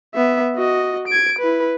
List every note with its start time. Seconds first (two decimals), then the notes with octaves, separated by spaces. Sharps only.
0.15 B3 E5
0.56 F#4 D#5
1.08 G#6 D7
1.39 E4 B4